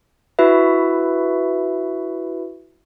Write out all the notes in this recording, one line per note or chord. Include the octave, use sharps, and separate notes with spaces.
E4 F#4 B4 E5